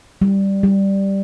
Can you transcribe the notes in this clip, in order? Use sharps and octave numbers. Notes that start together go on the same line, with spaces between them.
G3
G3